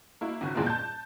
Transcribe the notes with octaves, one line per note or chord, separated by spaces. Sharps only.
A#3 E4 F#4
G#1 C#2 F#4 F#6
E2 G2 A#2 G#3 A#3 C4
A5 G6